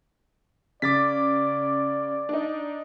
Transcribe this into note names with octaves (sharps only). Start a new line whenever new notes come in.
C#3 D5 D6 A6 B6
D4 D#4